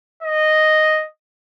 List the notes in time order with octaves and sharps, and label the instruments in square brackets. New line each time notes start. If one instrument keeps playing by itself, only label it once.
[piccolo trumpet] D#5